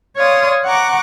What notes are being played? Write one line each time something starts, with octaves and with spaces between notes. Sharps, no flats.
C#5 D5 F5 C6 D#6
F#5 A#5 C#6 D6